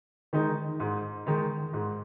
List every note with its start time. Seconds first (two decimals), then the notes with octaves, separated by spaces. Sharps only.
0.33 D#3 G#3 D#4
0.80 G#2
1.26 D#3 G#3 D#4
1.73 G#2